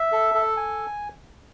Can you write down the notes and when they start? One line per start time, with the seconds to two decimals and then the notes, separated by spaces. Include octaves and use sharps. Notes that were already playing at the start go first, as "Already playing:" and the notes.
Already playing: E5
0.12 A4
0.34 A4
0.57 G#5